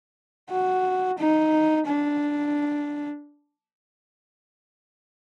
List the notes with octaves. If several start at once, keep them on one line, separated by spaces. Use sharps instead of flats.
F#4
D#4
D4